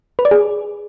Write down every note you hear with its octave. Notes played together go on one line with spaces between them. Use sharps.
B4
D5
G#4